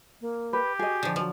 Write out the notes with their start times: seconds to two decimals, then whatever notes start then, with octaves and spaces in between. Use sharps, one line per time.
0.21 A#3
0.53 G4 B4
0.79 F#4 G#4 D#5
1.03 D3 F3
1.16 F3 F#3